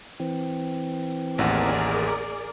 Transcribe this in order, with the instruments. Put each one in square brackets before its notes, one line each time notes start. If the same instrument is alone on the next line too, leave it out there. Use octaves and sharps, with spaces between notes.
[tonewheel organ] E3 C4
[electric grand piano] A1 D#2 F#5 [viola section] G#4 A#4 D5